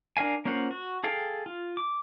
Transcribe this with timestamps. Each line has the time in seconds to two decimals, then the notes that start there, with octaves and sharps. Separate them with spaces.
0.17 D4 A#4 F5 G#5
0.45 A#3 C#4 F4 C5 F#5
0.71 F#4
1.04 G#4 A4 F5 G5
1.46 F4
1.77 D6